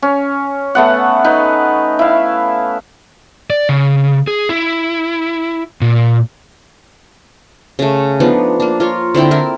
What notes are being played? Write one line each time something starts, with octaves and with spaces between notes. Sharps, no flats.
C#4
A3 B3 F#5
D#4 B4
E4 F5
D5
C#3
G#4
E4
A#2
C#3 A3
F3 B3 D4 D#4
A#3 D4
F4 A#4 C#5
D3 C4 E4 G5
E4 A#4 D5 E5